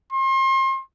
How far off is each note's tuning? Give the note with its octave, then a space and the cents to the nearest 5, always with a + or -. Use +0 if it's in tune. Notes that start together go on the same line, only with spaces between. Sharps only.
C6 +35